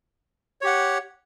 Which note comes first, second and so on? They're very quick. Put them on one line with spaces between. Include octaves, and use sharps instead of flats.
C#5 G4 F#5